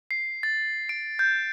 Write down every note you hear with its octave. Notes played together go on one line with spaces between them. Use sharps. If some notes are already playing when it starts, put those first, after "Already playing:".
C7
A6
D7
G6